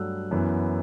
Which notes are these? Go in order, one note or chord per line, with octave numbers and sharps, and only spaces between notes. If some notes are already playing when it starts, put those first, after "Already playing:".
Already playing: G2 F#3 A3 E6 F#6
F#2 E3 B3